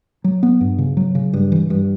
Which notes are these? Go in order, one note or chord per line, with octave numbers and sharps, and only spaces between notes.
F#3
B3
G2
C#3
F#3
C#3
G2
E3
G2